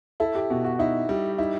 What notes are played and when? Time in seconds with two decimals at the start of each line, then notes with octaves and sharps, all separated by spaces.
0.20 E4 A4
0.35 G4
0.50 B2 F#4
0.65 F#4
0.79 D#4 E4
1.09 G3
1.38 D#4 E4